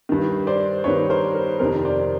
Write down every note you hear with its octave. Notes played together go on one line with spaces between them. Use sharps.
G2 D#3
C5 D5
G2 D#3 B4 C#5
A#4 C5
A#4
F2 C3 D#3 A#4 C5
C5 D5